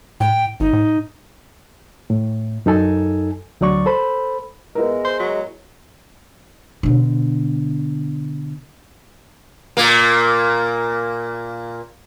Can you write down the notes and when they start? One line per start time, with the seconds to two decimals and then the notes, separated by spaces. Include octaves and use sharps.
0.20 A2 G5
0.60 G#1 D#4
0.73 A2
2.10 A2
2.66 F#2 D#4 A4 G#5
3.61 D2 F#3 D5 C#6
3.86 A4 C5 B5
4.75 G#3 B3 E4 A#4
5.05 C5
5.19 F#3
6.83 B2 D3
9.77 A#2 A#3